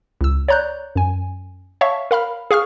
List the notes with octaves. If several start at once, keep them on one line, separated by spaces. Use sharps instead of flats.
C#2 E6
C#5 D5 A#5 F#6 G6
F#2 G#5
C#5 E5 F5 A5 C#6
A#4 F5 B5 F6
G#4 F5 C#6 F6